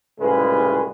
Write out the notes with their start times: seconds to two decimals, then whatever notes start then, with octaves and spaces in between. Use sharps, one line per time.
0.20 C2 A2 C#3 G#3 F4 B4